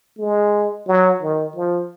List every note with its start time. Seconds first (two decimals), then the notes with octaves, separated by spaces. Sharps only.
0.18 G#3
0.87 F#3
1.22 D#3
1.56 F3